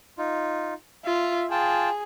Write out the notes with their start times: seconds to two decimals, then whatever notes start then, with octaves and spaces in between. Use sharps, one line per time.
0.18 D#4 F4
1.05 F4 E5
1.51 F4 G#4 G5 A5